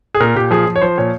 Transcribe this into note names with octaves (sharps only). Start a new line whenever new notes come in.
G#4
A#2 A#4
A#2 G4
F3 G#4
F3
C#5
F3 C5
A#2 C#5